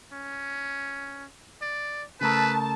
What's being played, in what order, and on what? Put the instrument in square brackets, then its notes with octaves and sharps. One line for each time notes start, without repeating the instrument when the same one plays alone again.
[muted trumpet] C#4
D5
[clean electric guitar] C#3 A3 A#4 [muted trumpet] B4 [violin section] A5